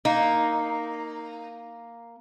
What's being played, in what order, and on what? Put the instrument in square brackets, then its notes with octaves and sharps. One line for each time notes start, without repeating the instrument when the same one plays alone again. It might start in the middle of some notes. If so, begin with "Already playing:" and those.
[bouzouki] A#3 [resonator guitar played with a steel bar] D#4